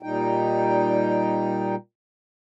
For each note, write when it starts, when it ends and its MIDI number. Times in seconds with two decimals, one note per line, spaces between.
0.03 1.75 46
0.03 1.75 55
0.03 1.75 63
0.03 1.75 79